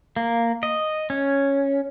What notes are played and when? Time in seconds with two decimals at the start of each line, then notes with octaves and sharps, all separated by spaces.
0.16 A#3
0.63 D#5
1.10 C#4